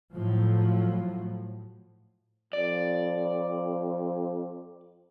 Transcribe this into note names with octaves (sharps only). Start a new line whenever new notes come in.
A2 F3 F#3
F2 D5